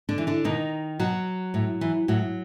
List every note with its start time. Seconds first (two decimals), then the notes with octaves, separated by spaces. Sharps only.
0.09 D3 D4
0.18 E3
0.27 D3 D4
0.44 B2 D#3 D#4
0.99 B2 F#3 F#4
1.54 A2
1.81 E3
2.08 A2 F#3 F#4